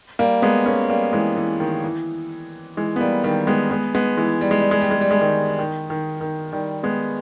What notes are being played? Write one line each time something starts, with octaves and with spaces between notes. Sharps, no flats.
G3 A#3
G#3 B3
A#3 C#4
G3 A#3
E3 G#3
E3
D#3
E3
E3 G#3
B3
G3 A#3
D#3 G3
G#3 B3
G#3 B3
G#3 B3
E3 G#3
G3
G#3
G3
G#3
G3
G#3
G3
G#3
D#3 G3
D#3
D#3
D#3
D#3 G3
G#3 B3